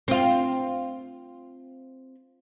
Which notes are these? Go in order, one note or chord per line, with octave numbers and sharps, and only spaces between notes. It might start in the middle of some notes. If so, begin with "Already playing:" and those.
C4 F4